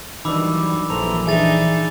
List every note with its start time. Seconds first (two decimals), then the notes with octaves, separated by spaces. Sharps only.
0.25 D#3 E3 F#3 G3 D4 B5 D6 E6
0.90 A#1 F#2 E3 A4 C5 A#5 F7
1.27 E3 D4 D#4 G#4 E5 G#5 A6 F7